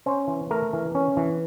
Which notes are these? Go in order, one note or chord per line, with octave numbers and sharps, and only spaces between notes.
C#4 C5
E3
A3 A#4
E3
C#4
E3